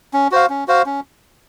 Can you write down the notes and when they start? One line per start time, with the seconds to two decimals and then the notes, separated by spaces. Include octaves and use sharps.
0.13 C#4
0.31 F#4 C5 F5
0.50 C#4
0.68 F#4 C5 F5
0.86 C#4